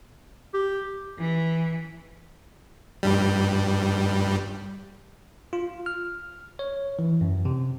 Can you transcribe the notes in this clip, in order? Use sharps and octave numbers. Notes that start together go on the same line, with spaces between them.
G4
E3
G2 G3
F4
F6
C#5
E3
F#2
C3